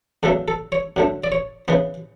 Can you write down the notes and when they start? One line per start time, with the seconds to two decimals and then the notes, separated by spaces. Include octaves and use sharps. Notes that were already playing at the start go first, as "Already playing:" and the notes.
0.23 E2 C#3 F#3 A3 A4
0.48 A4
0.72 C#5
0.96 F#2 D3 A3
1.24 D5
1.32 C#5
1.68 C#3 E3 B3